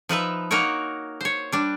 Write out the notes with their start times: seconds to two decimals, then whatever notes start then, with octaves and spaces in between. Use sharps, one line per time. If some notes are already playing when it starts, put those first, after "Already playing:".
0.09 F3 D#4 B4 E5
0.51 A#3 D#4 F#4 A#4 C#5
1.21 C5 C#5
1.52 G3 D4